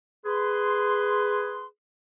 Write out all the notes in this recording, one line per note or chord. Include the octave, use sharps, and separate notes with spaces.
G#4 B4 C6